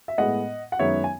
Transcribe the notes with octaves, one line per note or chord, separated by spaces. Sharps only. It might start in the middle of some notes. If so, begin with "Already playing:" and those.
E5
A2 G#3 B3 D#5 F#5
F#5
F#2 D#3 G#3 B3 C#5 E5
G#5